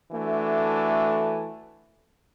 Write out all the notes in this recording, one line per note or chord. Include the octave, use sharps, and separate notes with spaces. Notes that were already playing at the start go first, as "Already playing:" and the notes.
E3 A3 D4 F#4 A4